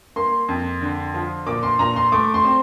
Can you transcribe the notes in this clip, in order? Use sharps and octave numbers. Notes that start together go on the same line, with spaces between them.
A#3 C6
F2
D3
F3
A#2 D6
C6
A#2 A#5
C6
A3 D6
C6
C4